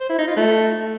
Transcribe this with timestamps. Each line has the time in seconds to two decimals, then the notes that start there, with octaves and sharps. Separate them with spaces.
0.01 C5
0.10 E4
0.19 D#4
0.28 F4
0.37 A3